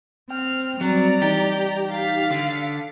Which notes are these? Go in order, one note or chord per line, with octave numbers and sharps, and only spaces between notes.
C4 G5 F6
F#3 G3 C4 D5 A#5
E3 D#4 G4
F5 A6 B6
D3